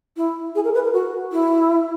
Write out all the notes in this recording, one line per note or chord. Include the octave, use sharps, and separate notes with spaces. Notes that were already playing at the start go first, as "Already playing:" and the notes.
E4
G#4
A#4
B4
A#4
F#4
E4